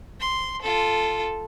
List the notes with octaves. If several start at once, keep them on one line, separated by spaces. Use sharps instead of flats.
C6
F4 A4